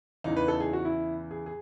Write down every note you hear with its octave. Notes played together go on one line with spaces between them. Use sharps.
E2 C#3 E3 D#4
B4
A4
G#4
F#4
E4
G#4
G#4